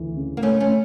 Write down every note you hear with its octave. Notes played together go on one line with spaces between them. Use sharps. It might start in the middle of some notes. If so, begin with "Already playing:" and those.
Already playing: D2 E3
C#3
A#3
C#3 A3 C#4
A3 C#4
C#3